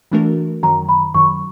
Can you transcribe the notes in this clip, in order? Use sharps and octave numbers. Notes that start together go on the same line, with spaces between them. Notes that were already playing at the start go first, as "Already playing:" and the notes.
E3 A3 D4 F#4 A#4
F#2 D#3 F#3 A#5
B5
F#2 D#3 F#3 C#6